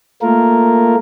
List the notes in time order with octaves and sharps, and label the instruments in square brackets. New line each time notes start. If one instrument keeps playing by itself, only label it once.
[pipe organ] A3 A#3 F4 A#4